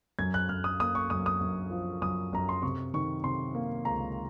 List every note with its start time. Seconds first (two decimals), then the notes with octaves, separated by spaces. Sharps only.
0.19 F#2 G#6
0.34 F#6
0.49 F#2 F6
0.64 D#6
0.80 A#3 D#6
0.95 C#6
1.10 F#2 D#6
1.26 D#6
1.41 F#2
1.71 F3
2.02 F#2 D#6
2.33 F#2 A#5
2.49 C6
2.62 C3 C#6
2.94 D#3 C#6
3.24 C3 C6
3.55 A#3
3.85 C#2 A#5